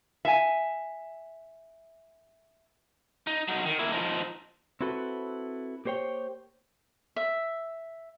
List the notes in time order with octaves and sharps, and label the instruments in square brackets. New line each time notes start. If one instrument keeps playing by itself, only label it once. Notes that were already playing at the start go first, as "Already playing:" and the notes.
[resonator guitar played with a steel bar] E5 G#5
[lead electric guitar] D#4
F#3 D#4
D#3
A#3 E4
F3 D#4
[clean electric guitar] C4 E4 F#4 A4 B4
A#3 G4 C5 C#5 G5
[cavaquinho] E5